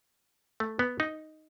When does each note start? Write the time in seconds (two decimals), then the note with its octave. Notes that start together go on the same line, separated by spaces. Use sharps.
0.60 A3
0.79 B3
1.00 D#4